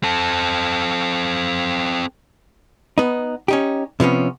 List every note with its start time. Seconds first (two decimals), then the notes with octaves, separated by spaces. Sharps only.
0.03 C4 A4
2.98 B3 D#4
3.48 C#4 D#4 G4
4.00 C3 F3 B3 C#4